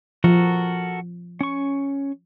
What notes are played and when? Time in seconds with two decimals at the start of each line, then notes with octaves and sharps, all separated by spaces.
0.24 F3 F#4 A4 A#4
1.41 C#4 C#6